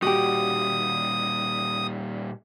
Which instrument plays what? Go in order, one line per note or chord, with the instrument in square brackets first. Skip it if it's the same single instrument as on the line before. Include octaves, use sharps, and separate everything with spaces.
[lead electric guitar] A#2 G3 [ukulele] F#4 G4 [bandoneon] D#6